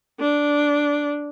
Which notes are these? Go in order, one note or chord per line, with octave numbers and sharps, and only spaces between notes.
D4